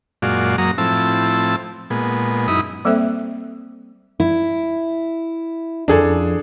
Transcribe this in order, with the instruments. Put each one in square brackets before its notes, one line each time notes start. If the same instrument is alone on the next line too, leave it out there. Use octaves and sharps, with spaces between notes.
[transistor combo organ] F#2 A#2 G#3 F#4 D5 F5
F#2 F#3 A#3 A#5 D#6
A2 F3 C4 E4 A5 E6
A#2 G#3 B3
F#2 D#4 E4 B5 D#6
[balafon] G3 A#3 C4 A4 C5 E5
[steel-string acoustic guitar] E4
[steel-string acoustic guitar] F2 [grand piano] D4 G#4 A4